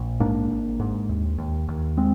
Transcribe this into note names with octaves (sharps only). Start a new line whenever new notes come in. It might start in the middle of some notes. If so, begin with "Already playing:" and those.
Already playing: A#1
G#2 A#3 D4
G#1
G#2
D#2
D#2
D#2
G#3 C4